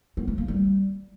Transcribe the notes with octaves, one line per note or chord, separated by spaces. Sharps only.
B3
A3
A#3
G3